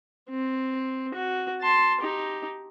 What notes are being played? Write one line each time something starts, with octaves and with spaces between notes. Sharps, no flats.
C4
F#4
A5 C6
D#4 G4